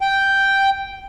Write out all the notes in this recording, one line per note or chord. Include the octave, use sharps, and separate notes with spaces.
G5